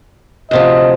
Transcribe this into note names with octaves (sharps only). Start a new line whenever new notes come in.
D2 C3 F3 D#5